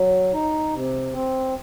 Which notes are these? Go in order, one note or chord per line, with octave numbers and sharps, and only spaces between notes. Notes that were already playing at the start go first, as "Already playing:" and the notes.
Already playing: F#3
D#4
C3
C4